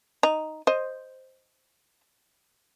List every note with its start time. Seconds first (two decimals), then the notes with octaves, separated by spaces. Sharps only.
0.23 D#4
0.67 C5 D#5